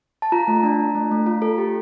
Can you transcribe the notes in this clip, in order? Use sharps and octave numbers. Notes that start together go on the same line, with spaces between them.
A5
F4 A#5
A3
D4
D4
A3
A3
F4
A4
G4